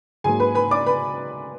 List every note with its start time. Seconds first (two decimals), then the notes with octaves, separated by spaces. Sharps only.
0.24 G#2 F#3 A#3 G#4 G#5
0.40 B4 B5
0.55 B4 B5
0.71 D5 D6
0.86 B4 B5